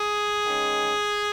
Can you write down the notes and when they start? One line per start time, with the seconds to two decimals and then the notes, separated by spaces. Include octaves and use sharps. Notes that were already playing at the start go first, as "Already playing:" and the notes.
Already playing: G#4
0.46 D#3 G#3 C#4